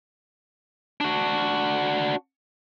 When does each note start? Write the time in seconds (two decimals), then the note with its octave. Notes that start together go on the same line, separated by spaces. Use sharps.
1.01 D4 F#4